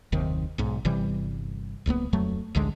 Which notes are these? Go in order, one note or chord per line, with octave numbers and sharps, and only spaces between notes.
F#1 D#2 C3 D#3
B1 G#2
G1 C3 E3 G3
D1 C#2 A#3 B3
D1 F2 F#3 A3
A1 D2 D3 G#3